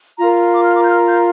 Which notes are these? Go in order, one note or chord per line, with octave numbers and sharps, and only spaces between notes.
F4 A#4 A#5
D6
F6
D6
G6
F6
G6